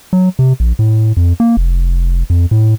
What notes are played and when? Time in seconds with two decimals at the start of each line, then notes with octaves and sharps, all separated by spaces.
0.13 F#3
0.39 C3
0.60 A#1
0.79 A2
1.17 F2
1.40 A#3
1.57 F1
2.30 F2
2.51 A2